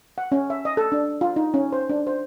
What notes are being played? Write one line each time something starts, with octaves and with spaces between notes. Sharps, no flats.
F#5
C#4
E5
D#5
A4
D4
F4
D#4
C#4
C5
D4
C5